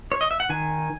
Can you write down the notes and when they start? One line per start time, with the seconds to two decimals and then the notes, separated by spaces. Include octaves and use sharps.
0.12 C#5
0.21 D#5
0.31 E5
0.40 F#5
0.49 D#3 G#5